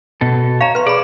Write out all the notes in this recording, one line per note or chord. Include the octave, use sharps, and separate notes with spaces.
B2 A4
C#5 F5 A#5
B4 C6
G#4 D5 B5